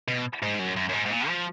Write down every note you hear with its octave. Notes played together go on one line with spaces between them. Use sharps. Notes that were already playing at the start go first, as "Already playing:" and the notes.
B2
G#2
F#2
F#2
F#2
G#2
G#2
A#2
F3